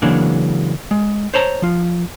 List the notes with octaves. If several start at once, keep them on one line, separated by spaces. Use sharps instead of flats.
C#3 E3 F#3 G#3 A#3 D4
G#3
C5 C#5 A5 A#5
F3 F4